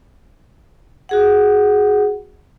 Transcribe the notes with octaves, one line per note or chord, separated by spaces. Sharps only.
F#4 G#4 F#5